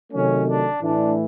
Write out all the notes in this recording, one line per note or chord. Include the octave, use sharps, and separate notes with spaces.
C3 D#3 F#3 A3 C#4
D4
A2 E3 A3 D4